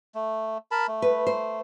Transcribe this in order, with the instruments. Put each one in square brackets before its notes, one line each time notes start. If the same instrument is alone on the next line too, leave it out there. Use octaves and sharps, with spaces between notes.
[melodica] A3
A#4 A5 B5
A3
[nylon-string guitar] B4
C5